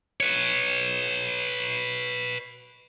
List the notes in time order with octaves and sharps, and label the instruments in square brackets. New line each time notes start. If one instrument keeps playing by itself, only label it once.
[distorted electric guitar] B4 C#5